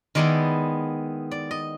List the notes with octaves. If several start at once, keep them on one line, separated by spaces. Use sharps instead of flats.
D#3 G#3 B3 E4 D5
D5
D#5